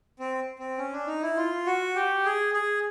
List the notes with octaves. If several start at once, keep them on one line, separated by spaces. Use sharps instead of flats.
C4
C4
C#4
D4
D#4
E4
F4
F#4
G4
G#4
G#4